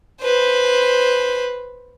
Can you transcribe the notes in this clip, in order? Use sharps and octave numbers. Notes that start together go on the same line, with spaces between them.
B4 C5